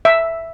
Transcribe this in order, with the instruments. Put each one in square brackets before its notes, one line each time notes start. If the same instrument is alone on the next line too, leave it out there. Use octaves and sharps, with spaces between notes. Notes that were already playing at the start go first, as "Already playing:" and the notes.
[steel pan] E5